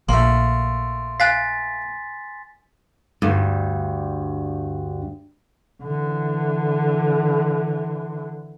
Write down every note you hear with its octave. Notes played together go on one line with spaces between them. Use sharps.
A#1 A3 A#3 C6
F5 G#5 F#6 A6 B6
D2 G2
D3 E3